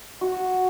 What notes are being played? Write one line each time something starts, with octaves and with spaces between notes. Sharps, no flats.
F#4